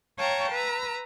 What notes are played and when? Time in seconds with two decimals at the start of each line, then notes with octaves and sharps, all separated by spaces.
0.19 C#5 F5 G5 A5 A#5 C#6
0.52 B4 A#5 E6